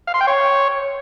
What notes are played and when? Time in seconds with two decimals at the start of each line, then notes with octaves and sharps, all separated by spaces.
0.07 F5
0.14 C6
0.21 G5
0.27 C#5